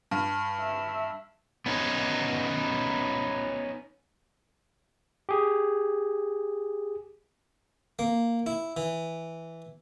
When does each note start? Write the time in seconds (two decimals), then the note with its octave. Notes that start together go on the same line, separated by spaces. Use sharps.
0.11 G2 A5
0.60 E5
1.66 B3 C#4 D#4
5.29 G4 G#4
7.99 A#3
8.46 E4
8.77 E3